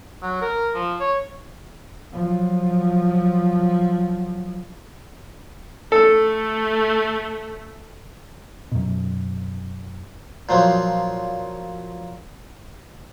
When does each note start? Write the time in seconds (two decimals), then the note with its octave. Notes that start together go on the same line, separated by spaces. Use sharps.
0.23 F#3
0.42 A#4
0.75 F3
1.00 C#5
2.13 F3 F#3
5.92 A3 A4
8.72 F#2 B2
10.49 A#2 F3 F#3